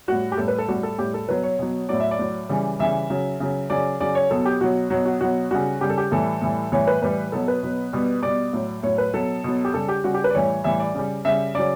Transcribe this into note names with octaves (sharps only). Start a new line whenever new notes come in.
A2 G3 F#4
G4
A2 G3 A4
B4
A4
A2 G3 F#4
A4
A2 G3 G4
A4
B2 F#3 B4
C#5
B2 F#3
A2 F#3 D5
E5
D5
A2 F#3
C#3 E3 G3
C#3 E3 G3 E5
C#3 F#3
C#3 F#3
C#3 F#3 D5
C#3 F#3 D5
C#5
B2 F#3 A4
G4
B2 F#3 F#4
B2 F#3 F#4
F#4
B2 F#3 F#4
C#3 G3 F#4
C#3 G3 G4
A4
G4
A2 E3 G3 A4
A2 E3 G3
A2 E3 G3 C#5
B4
A2 E3 G3 B4
B2 F#3 A4
B4
B2 F#3
B2 G3
B2 G3 D5
A2 F#3
A2 F#3 C#5
B4
B2 F#3 A4
B2 F#3
G4
C#3 G3 A4
G4
C#3 G3 F#4
G4
B4
D5
A2 E3 G3 C#5
A2 E3 G3 E5
D5
C#3 G3
C#3 G3 E5
C#3 F#3 D5